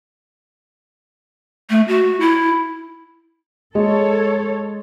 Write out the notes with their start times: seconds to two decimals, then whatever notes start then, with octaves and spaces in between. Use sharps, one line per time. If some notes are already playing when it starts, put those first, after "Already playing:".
1.70 A3
1.88 F#4
2.20 E4
3.75 G#3 A4 C#5